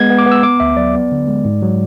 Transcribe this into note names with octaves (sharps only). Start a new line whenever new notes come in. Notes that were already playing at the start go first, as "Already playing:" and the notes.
Already playing: G#3 B3 G#6
B3
D6
B3
E6
B3 D6
D2 E5
F#3 D5
B3
D3
G#3
G#2
F#3